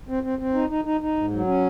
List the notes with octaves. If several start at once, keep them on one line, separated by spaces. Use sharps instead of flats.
C4
C4
C4
D#4
D#4
D#4
D#4
G#2
F#3
C#4